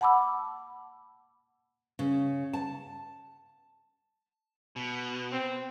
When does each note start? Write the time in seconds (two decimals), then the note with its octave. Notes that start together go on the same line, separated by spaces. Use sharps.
0.01 F#5 A5 B5 D6 E6
1.99 C#3
2.53 A5
4.76 B2
5.32 C4